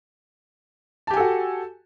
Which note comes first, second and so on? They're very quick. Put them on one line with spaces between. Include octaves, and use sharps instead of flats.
A5 G4 G#5 A4 F#4